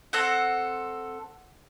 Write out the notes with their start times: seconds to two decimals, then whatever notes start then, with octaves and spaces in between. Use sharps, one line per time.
0.13 C4 A4 F#5